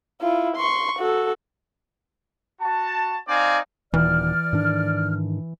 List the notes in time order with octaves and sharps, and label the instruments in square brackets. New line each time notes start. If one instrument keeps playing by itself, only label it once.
[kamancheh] E4 F4
C6 C#6
F#4 A4
[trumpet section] F#4 A5
C4 D#4 D5 F5 G#5
[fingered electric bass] D#1 [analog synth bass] E3 [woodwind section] D5 F6
[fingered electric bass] G#2 D#3 D4